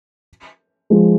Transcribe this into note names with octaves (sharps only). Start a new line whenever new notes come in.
F3 G#3